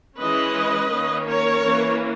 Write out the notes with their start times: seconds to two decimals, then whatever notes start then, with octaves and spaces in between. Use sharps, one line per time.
0.19 E3 G#3 C#4 B4 D#5
0.91 D#3 A#3 C#4
1.27 A#4 C#5
1.64 E3 A#3 C#4